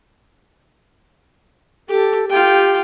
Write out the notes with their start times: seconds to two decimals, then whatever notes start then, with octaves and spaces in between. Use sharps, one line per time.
1.89 G4 A4
2.30 F4 G4 G5